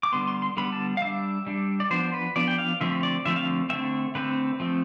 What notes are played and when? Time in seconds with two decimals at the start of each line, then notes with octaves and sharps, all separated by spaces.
0.03 D6
0.12 D3 G3 B3 C6
0.27 C6
0.42 C6
0.57 D3 G3 B3 B5
0.72 A5
0.97 F5
1.02 G3 D4 E5
1.47 G3 D4
1.80 D5
1.91 F3 B3 D4 C5
2.13 B4
2.36 F3 B3 D4 D5
2.48 G5
2.58 F5
2.81 D3 F3 A3 C4 E5
3.03 D5
3.25 D3 F3 A3 C4 E5
3.36 F5
3.70 D3 A3 C4 E5
4.15 D3 A3 C4 B4
4.60 F3 A3 C4